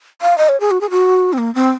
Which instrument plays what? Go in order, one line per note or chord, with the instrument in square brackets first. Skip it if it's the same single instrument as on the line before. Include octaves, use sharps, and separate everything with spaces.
[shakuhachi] F5
D#5
C#5
G#4
F#4
G#4
F#4
C4
A#3
C4